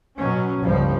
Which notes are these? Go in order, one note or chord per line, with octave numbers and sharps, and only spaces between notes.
B2 F#3 C#4
G1 C#2 F3 G3